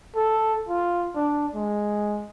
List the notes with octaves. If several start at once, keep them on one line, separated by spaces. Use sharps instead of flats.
A4
F4
D4
G#3